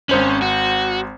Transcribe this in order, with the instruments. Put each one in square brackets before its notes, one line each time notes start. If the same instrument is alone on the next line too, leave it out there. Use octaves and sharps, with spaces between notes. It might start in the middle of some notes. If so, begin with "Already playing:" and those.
[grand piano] G#1 C5 F#7 [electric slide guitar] C#4
[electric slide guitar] F#4